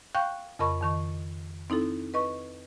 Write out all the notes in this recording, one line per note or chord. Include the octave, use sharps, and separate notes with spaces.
F5 G5 C#6 F#6 G6
F2 C#3 A#4 D#5 B5 C#6
F2 D#3 C#6
C4 D#4 E4 A4
B4 D#5 C#6